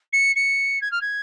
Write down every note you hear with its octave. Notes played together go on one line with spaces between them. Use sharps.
C#7
C#7
G#6
F6
G#6